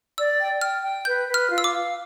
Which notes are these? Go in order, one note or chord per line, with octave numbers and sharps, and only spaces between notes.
D5 E6
G5
G5 F6
G5
B4 G6
B4
F6
F4
E6
D6
F5